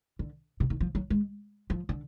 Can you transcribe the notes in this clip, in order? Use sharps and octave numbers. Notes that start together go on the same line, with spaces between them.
D3
C3
D#3
F3
F#3
G#3
F3
D3